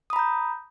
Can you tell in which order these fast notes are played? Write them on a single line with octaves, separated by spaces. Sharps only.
D#6 B5 A#5 G6